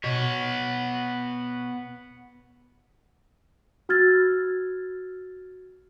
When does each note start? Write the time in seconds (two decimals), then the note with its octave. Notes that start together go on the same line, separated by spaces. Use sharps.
0.04 B2 B3 C#5
3.89 F#4 E6 F6 G#6 A6